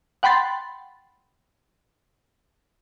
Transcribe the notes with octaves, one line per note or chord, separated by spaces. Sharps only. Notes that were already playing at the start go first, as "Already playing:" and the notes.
F#5 G5 B5 C6 A6